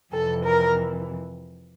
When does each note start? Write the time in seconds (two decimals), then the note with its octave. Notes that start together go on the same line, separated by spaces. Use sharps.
0.12 F2 C3 E3 A4
0.44 A#4